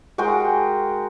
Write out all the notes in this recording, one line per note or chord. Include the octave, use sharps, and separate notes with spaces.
G#3 F#4 A#4 G5